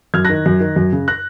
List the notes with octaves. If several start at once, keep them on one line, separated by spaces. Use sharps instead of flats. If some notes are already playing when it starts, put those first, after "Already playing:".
F#2 F6 G#6
F#6 A#6
D#3
F#2
D#3
F#2
C#3
F#6 A#6